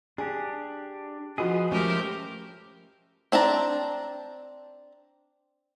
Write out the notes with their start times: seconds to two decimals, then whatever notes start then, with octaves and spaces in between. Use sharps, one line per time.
0.18 D4 G4 G#4
1.38 F3 F4 F#4 G#4 B4 D#5 D#6
1.72 F3 G#3 A3 C#4 G4 A#4 C5
3.32 C4 D4 A5 A#5